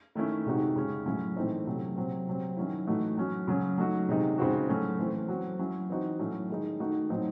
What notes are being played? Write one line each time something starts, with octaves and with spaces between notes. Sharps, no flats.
D#3 A3 C#4 E4
C3 D#3 G#3 D#4 F#4
C#3 G#3 C#4
A2 F#3 C#4 E4
A2 E3 A3 C4 D#4
C3 F#3 A3
C3 F#3 C4
C3 F#3 C4
D#3 F#3 C#4 E4
A2 E3 A3 D#4 F#4
F#3 C#4 F#4
C#3 F#3 C#4
F#3 A3 D#4 F#4
C3 D#3 G#3 D#4
C#3 G#3 C4 D#4 F#4
A2 F#3 A3 C#4
E3 A3 C4
F#3 C4 F#4
F#3 C#4 E4
E3 C4 D#4 F#4
A2 F#3 A3 C#4 E4
D#3 G#3 D#4
D#3 A3 D#4 F#4
A2 F#3 C4 D#4